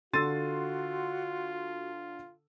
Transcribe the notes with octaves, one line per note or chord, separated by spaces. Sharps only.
D3 F4 F#4 A4 C6 E6 A6 D#7